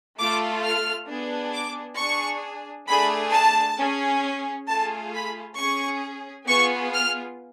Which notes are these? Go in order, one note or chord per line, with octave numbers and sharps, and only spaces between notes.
A3 F4 A4 D6
F6
B3 D4 G#4
D6
D4 G#4 C#6
A3 D4 G#4 B5
A5
C#4 G#4
A3 F4 G#4 A5
B5
C#4 G#4 C#6
B3 F4 G#4 C#6
F6